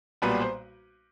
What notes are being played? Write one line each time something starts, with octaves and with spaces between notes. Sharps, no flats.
B1 A#2 G3 B3 B4
C5